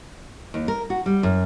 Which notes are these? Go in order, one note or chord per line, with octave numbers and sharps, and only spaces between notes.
D#2
A#4
F#4
G3
F#2